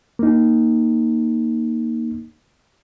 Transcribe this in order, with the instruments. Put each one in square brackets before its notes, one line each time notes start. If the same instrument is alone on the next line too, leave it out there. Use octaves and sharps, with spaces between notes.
[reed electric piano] A#3 D#4